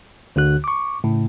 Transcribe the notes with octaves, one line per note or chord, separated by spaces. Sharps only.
D2 D3 F#4 F#6
C#6 D6
A2 C#3